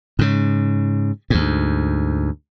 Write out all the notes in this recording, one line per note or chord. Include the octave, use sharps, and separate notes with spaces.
G#2 C#3
D2 G#2